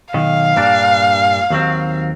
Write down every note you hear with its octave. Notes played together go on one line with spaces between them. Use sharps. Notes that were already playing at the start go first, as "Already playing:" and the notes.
B1 D#3 F5
G2 A#2 D4
D#2 F#3 C4